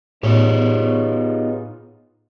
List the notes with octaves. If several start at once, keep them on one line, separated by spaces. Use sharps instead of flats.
A2 B3 D#4 F4 G4 G#4 C#5